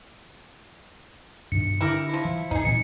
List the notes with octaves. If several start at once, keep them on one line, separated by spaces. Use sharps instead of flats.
G2 B2 D#3 C#7
D3 E4 G4 A#4
F3 E4
E3
D#1 E2 D#4 G#4
A#2 E3 C4 C#7